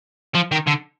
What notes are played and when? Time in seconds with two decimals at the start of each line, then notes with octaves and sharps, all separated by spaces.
0.35 F3
0.52 D#3
0.67 D3